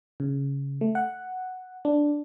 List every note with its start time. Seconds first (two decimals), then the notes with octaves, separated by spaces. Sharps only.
0.20 C#3
0.81 A3
0.95 F#5
1.85 D4